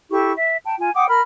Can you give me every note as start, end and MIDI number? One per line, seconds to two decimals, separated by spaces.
0.10 0.32 64
0.10 0.32 67
0.10 0.32 69
0.10 0.32 85
0.37 0.56 76
0.65 0.74 79
0.65 0.74 81
0.79 0.91 65
0.79 0.91 80
0.95 1.07 78
0.95 1.07 79
0.95 1.07 86
0.95 1.07 87
1.08 1.21 70
1.08 1.21 83
1.08 1.21 89